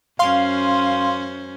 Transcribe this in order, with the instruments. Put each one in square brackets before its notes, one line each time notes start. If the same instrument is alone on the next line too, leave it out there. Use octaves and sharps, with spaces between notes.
[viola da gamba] F#2 C#4 C5 [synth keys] F5 C6